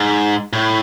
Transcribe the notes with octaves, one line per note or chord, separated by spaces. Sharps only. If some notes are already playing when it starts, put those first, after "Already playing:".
Already playing: G#2
A2